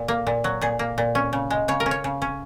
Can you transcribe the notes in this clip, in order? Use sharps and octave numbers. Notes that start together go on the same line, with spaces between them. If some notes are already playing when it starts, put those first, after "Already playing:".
Already playing: A#2
A#3
A#2
F#3
A#2 G#4
A#3
A#2
C#4
C#3
G#3
C#3 C#5
A#4
C#4
C#5
C#3
C#4